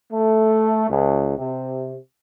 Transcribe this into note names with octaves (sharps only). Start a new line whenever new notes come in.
A3
C#2
C3